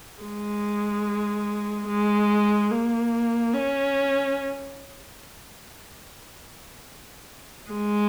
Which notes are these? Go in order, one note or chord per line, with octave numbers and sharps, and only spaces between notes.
G#3
G#3
A#3
C#4
G#3